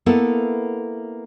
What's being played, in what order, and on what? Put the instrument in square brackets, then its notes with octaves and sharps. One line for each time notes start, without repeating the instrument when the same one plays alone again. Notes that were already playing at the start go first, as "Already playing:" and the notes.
[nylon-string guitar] A#3 B3 E4 A4